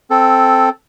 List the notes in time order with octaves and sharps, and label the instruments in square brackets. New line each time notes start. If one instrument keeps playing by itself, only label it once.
[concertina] C4 A4